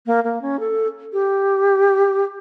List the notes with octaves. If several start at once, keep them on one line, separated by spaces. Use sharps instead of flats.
A#3
A#3
C#4
A4
G4